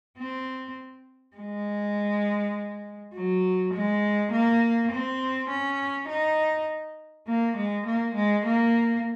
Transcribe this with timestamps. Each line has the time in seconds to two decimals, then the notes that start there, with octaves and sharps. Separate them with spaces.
0.18 C4
1.37 G#3
3.15 F#3
3.74 G#3
4.32 A#3
4.92 C4
5.50 C#4
6.09 D#4
7.28 A#3
7.57 G#3
7.86 A#3
8.15 G#3
8.46 A#3